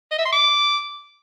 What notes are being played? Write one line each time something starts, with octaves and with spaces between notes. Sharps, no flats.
D#5
E5
C6
D6